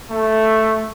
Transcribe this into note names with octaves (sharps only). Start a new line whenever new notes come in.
A3